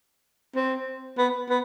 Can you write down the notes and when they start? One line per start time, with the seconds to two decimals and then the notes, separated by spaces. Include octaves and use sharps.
0.55 C4
1.18 B3
1.49 B3